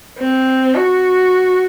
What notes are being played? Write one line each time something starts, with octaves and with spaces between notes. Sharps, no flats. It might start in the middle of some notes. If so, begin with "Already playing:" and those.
C4
F#4